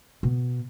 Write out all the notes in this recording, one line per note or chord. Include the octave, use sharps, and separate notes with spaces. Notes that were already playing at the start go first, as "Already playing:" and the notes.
B2